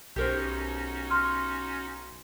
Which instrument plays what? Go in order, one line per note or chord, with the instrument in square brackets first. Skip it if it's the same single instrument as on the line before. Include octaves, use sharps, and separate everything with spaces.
[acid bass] B1 [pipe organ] C#4 D#4 F#4 [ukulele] G4 A#4 C5
[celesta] C6 F6